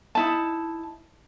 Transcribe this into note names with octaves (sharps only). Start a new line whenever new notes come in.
D#4 E4 A5